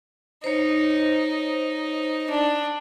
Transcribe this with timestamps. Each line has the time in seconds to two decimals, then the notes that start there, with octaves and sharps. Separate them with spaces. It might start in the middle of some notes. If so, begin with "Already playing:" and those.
0.44 D#4 C5 C#5
2.29 D4